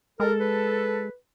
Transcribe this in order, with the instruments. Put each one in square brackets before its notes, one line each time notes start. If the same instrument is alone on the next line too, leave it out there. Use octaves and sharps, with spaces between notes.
[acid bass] G#3 [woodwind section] A4 [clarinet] A#4
[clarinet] B4